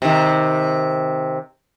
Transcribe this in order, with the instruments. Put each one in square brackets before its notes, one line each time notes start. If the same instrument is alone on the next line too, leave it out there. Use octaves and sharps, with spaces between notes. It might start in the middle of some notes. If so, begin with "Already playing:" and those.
[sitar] C3 D#3